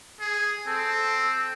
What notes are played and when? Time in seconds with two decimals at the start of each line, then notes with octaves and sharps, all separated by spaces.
0.20 G#4
0.67 C4 A4